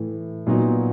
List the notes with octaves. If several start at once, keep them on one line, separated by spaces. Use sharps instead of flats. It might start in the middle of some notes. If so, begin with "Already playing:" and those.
Already playing: A2 E3 A3
A#2 F#3 B3 D#4